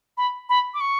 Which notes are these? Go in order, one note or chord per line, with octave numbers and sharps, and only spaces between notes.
B5
B5
D6
C#6